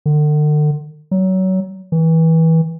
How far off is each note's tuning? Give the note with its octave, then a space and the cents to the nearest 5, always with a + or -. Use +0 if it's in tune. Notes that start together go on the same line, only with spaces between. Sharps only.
D3 +40
F#3 +25
E3 -25